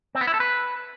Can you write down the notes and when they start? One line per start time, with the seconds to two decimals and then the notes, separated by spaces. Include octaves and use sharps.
0.15 C4
0.21 B3
0.27 E4
0.34 A4
0.40 B4